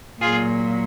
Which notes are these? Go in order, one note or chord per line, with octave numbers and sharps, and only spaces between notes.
A#2 F#3 F4 G#4